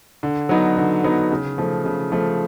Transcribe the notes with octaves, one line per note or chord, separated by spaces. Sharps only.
D3
F#3 B3 D#4
D3
F#3 B3 D#4
C#3
F3 A3
C#3
F3 A3